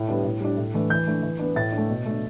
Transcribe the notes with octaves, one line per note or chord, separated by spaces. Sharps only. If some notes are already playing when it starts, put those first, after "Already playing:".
Already playing: A2
G3 B3 D4
A2
G3 D4
A2
E3 A3 D4
E3 G6
A3 D4
E3
B3 D4
A2 A6
D4
A3
B2
A3 D4